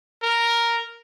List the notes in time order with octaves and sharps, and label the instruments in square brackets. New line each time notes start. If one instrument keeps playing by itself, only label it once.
[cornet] A#4